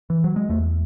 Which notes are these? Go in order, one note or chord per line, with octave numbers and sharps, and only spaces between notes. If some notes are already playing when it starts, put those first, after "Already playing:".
E3
F#3
G#3
E2 A3